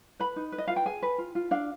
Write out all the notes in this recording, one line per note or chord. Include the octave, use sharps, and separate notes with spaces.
B4 B5
D#4
B4
D#5
F4 F5
G5
G#4 G#5
B4
F4
F4
D4 F5